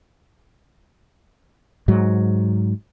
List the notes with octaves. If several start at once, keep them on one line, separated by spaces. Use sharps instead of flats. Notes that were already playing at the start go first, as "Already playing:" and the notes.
G#2 F#3